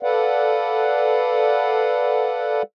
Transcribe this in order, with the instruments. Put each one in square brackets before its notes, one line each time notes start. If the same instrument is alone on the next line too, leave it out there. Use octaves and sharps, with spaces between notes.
[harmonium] A4 B4 D5 F5 F#5